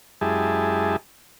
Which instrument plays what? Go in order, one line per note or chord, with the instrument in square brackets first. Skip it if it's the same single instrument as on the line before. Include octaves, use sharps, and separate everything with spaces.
[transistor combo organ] F#2 G#3 E4 G4 G#4 A5